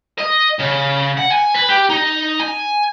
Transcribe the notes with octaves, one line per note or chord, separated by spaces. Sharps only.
D#5
C#3
F#5
G#5
B4
G4
D#4
G#5